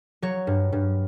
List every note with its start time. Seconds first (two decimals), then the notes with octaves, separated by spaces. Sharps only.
0.22 F#3 C#5
0.47 G2
0.72 G2